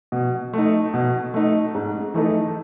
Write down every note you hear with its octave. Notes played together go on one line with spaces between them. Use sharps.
B2
A3 D#4
B2
A3 D#4
G#2
E3 A3 D#4 A4